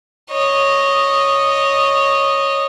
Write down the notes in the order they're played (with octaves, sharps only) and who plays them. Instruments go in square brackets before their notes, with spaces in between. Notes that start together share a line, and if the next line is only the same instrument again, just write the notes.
[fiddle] C#5 D#5